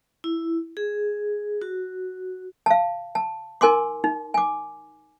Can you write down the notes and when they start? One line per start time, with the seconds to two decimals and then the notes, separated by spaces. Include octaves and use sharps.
0.24 E4
0.77 G#4
1.62 F#4
2.66 F5 A5
3.15 A5
3.61 D#4 A#4 G#5 C6 D6
4.04 D#4
4.34 G#5 D6